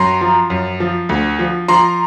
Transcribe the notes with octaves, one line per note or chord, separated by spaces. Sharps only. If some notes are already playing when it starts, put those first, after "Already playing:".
Already playing: F#2 A#5 C6
F3
F#2
F3
D2
F3
F3 A#5 C6